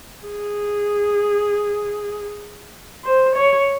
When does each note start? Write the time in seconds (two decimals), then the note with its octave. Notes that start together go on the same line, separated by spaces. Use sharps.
0.24 G#4
3.05 C5
3.36 C#5